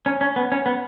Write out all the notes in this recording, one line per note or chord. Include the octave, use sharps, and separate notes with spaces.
C#4
C#4
B3
C#4
B3